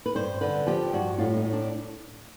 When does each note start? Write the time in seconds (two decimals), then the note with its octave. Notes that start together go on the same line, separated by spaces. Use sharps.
0.06 B4
0.15 G2 C5
0.41 D3 B4
0.66 F3 G4
0.93 G2 F#4
1.18 A2 F4
1.36 D#4
1.44 A2
1.53 D4